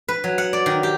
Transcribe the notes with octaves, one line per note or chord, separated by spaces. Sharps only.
B4
F#3
F#5
D5
D#3
G4